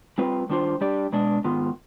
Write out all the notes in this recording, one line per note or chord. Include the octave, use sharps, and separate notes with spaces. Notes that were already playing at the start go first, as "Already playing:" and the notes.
G3 C4 F4 B4
D#3 G3 D4 F4 C5
G3 D4 G4 D5
B2 G#3 D4
G#2 D#3 B3 F4